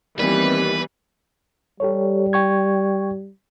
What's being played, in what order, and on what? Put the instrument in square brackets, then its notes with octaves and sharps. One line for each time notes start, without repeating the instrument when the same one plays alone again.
[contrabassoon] D#2 [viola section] E3 G3 B3 [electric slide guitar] C4 D5 [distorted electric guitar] B4
[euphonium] G3 [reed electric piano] G4 A4 C#5
[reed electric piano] G5 C#6 G#6